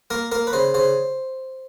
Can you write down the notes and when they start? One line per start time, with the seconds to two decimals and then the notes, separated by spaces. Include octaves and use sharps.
0.10 A#3 A#4
0.32 A#3 A#4
0.47 B4
0.53 C#3 C5
0.74 C#3 C5